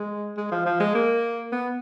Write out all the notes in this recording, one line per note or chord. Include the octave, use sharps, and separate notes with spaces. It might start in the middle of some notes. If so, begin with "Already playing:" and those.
Already playing: G#3
G#3
F3
F3
G#3
A#3
B3